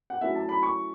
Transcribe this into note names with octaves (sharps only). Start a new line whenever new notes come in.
F#5
F#3 A3 C#4 E4 E5
A5
B5
C#6